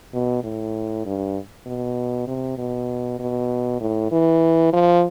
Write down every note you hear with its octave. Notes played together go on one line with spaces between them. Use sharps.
B2
A2
G2
B2
C3
B2
B2
A2
E3
F3